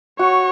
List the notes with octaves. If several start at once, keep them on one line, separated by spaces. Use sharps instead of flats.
F#4 C#5